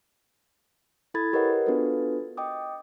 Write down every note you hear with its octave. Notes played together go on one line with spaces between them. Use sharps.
E4 A4 B5 G#6 A6
G4 A#4 B4 C#5 D#5 F#5
B3 D4 F4 F#4 A4 B4
D#5 G5 D6 D#6